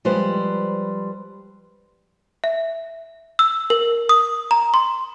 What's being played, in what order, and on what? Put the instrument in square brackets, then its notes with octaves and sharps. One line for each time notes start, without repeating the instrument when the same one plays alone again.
[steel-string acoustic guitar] F3 G3 G#3 B4 C5
[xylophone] E5
E6
A#4
D#6
A#5
C6